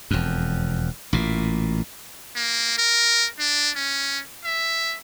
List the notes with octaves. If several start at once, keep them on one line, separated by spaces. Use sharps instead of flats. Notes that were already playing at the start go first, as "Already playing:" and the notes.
E1 F2
A1 A#2
A#3
A#4
D4
C#4
E5